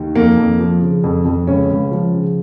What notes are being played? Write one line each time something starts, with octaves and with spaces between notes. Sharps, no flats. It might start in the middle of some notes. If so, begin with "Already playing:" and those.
Already playing: D#2 D#3
F2 A#3
F2
F3
C#3
F2
F2
C#2 C#4
C#2
F3
C#3